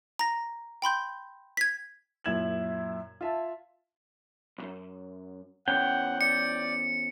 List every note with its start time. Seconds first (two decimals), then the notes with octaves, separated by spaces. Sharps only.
0.19 A#5 A#6
0.82 G5 B5 C6 G6
1.57 G#6 B6
2.24 F#2 A#2 E4 G#6 E7 F#7
3.21 F4 E5 A5
4.58 B1 F#2
5.68 E2 C#4 F#5 G5
6.21 D5 C#7